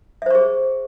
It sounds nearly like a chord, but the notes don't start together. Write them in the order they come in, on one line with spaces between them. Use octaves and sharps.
E5 C5 C#6 G#4